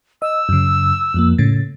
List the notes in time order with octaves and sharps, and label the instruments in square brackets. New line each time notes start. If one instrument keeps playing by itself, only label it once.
[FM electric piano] D#5 [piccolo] E6
[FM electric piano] F#2 C#3
F2 F3 A#3
A2 C#3 A6